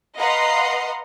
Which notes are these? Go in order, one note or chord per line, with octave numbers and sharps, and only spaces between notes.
B4 D#5 F5 F#5 A#5 C6